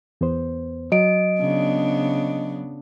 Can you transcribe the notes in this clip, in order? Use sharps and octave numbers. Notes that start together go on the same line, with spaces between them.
E2 B3 C5
F#3 D#5 D7
C#3 B3 D4